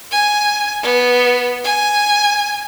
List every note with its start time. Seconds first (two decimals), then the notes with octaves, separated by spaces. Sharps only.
0.11 G#5
0.83 B3
1.64 G#5